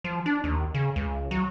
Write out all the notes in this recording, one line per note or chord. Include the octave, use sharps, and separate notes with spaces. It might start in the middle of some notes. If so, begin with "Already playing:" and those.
F3
D4
D#2
C#3
C#2
F#3